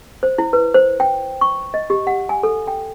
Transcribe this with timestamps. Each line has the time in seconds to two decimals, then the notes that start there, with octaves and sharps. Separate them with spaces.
0.23 C5
0.38 E4
0.53 B4
0.74 C5
1.00 G5
1.41 C#6
1.74 D#5
1.90 G4
2.07 F#5
2.29 G#5
2.43 A4
2.67 G5